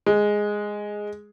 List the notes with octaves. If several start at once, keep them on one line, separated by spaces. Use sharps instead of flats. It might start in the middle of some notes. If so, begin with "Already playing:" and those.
G#3